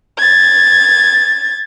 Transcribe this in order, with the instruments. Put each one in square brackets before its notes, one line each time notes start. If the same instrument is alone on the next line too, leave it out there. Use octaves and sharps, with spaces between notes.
[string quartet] G#6 A6